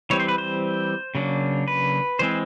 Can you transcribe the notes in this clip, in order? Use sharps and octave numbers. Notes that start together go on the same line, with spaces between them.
E3 G3 C4 C#5
C5
B4
C5
C#3 F#3 A#3 D4
B4
E3 G#3 C4 C5